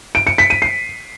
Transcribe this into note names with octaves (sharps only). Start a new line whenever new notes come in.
D7
C#7
B6
D#7
C7